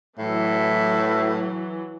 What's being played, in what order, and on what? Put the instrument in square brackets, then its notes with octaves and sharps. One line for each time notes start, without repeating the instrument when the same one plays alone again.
[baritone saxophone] A2 [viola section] E3 F#3 [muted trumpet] E5